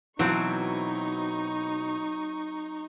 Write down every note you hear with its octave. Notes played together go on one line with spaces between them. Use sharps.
B2 E3 F#3 C4 D#4 C#6